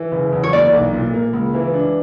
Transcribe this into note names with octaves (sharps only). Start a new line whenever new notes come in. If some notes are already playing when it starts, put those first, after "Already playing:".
Already playing: E3
F#1
E2
C#5
A#3 D5
B1
A#2
A#3
C#2
E3
D4